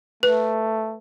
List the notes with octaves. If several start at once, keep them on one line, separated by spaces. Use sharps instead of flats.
A3 B4